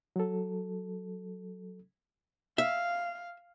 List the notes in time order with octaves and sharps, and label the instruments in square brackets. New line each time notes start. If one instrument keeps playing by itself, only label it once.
[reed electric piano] F#3 A4
[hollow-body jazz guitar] E5 [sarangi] F5